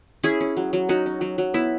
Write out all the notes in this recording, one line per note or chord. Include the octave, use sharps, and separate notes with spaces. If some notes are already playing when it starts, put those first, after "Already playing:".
C#4 E4 G#4
C#4
F#3
F#3
C#4 D#4 F#4
C#4
F#3
F#3
B3 E4